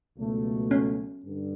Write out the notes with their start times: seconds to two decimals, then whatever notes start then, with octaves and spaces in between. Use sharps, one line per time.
0.17 C#2 B2 F#3 A3
0.71 C#4
1.25 G2 D3